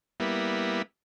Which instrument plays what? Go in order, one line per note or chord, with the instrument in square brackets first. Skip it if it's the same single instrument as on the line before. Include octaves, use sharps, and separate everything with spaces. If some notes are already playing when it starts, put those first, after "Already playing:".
[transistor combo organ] G3 A#3 B3 E4